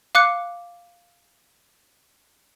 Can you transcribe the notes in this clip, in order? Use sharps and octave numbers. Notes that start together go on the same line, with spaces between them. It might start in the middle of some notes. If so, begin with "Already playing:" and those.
F5 D6 F#6 C#7